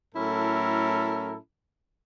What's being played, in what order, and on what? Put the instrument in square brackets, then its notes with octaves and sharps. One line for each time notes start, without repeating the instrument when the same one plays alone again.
[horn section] A2 F#3 C#4 E4 A4 A#4